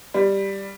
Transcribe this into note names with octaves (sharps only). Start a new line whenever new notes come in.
G3